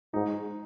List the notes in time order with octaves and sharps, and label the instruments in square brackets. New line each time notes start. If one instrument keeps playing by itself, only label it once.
[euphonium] G#2 [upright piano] D#4